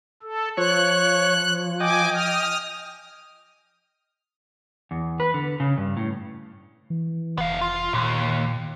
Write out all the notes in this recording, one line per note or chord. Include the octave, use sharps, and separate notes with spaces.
A4
F3 C#5 F#6
D#5 G5 G#5 D6
D#6 F6
E2
B4
D3
C#3
G2
A2
E3
F1 B3 F5
F4
D#2 A#2